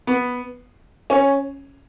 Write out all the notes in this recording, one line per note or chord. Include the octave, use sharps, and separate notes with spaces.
B3
C#4